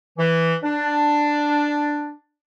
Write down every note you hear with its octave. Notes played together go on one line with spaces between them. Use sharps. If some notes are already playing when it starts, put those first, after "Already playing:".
E3
D4